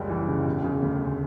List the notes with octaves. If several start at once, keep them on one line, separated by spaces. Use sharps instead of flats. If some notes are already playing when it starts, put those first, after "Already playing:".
Already playing: F#1 C#2 G3
E3
C#3
E1
C#3
D2